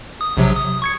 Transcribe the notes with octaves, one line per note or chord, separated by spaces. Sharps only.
D#6
A#1 C3 F#3
D#6
C#6 G#6 C#7